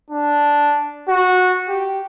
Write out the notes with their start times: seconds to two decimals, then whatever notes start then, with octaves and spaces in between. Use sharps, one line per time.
0.10 D4
1.08 F#4
1.68 G4